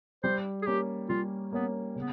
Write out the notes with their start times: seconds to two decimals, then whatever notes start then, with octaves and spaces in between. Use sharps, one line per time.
0.24 G3 C5
0.62 G#4
0.67 A#3 C#4 G4
1.09 G3 F4
1.52 A#3 B3 C#4
1.96 C#3 B3